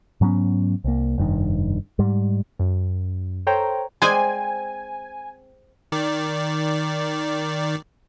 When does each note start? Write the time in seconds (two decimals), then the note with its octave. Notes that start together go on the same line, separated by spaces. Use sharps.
0.21 G#2 F#3 B3 C#4
0.84 C2 A#3
1.18 F1 G2 D#3
1.99 G#2 G3
2.59 F#2
3.47 A4 C5 C#5 G5 A#5
4.02 G#3 C4 C5 D5 G#5
5.92 D#3 D5